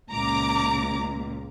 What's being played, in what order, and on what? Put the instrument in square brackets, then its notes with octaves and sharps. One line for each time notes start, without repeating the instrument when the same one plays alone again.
[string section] C#2 A#2 [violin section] A#5 D6